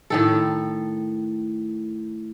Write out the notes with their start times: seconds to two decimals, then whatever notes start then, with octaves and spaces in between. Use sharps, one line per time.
0.10 A2 D#3 A4